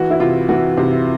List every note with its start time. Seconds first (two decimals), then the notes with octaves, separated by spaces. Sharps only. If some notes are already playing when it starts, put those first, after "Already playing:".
Already playing: E3 F#4
0.10 E4
0.20 C3 F4
0.49 E3 F#4
0.78 C3